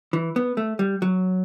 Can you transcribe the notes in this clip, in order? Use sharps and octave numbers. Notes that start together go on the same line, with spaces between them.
E3
B3
A3
G3
F#3